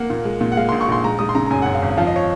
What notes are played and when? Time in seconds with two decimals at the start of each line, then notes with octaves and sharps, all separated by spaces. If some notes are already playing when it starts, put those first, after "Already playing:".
Already playing: A#3 F#5
0.10 A#2
0.25 G#3
0.41 A#2
0.52 F#5
0.57 G#3 F5
0.69 A#1 C6
0.81 C#6
0.88 A#1 C6
1.04 G#3 A#5
1.19 G#3 D#6
1.29 C6
1.35 C#3 A#5
1.46 A#5
1.51 F#2 G#5
1.62 F#2 F#5
1.75 F5
1.82 G#1
1.97 F3 F5
2.07 D#5
2.16 C#5